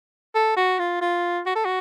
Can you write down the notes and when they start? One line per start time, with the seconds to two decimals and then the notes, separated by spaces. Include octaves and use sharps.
0.35 A4
0.57 F#4
0.79 F4
1.01 F4
1.46 F#4
1.55 A4
1.65 F#4